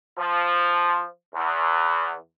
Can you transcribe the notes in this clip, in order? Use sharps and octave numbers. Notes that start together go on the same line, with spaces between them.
F3
E2